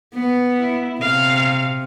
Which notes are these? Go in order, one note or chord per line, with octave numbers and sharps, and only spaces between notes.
B3
E4
C3 F5